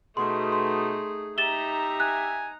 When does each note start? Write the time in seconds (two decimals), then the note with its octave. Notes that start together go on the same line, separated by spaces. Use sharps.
0.17 B2 A3 D#4 G#4 C6
0.52 C6
1.38 D#4 G4 E5 A#5 A6 E7 G7
2.00 G#5 F#6